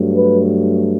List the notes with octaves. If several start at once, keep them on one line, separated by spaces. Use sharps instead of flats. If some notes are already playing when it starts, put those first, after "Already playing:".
Already playing: G2 F#3 A3
B4